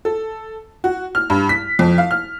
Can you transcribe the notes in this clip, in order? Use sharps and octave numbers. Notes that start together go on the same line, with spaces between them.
A4
F#4
F6
G2
B6
F2
F5
F6